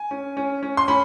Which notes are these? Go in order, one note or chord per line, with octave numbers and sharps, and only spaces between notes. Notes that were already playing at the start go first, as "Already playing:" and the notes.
Already playing: G#5
C#4
C#4
C#4
C6
C#4 B5